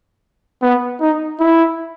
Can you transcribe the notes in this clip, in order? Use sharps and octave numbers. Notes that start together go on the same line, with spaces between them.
B3
D#4
E4